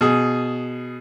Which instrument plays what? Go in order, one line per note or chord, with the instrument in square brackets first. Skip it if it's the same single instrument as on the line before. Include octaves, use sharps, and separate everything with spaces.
[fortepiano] B2 G#4